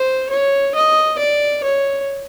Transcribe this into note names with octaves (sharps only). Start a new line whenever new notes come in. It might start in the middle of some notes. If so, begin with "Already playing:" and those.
Already playing: C5
C#5
D#5
D5
C#5